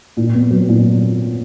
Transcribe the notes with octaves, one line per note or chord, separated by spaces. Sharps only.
A#2
B3
F#3
A#2